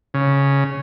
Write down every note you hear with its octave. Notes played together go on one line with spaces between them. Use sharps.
C#3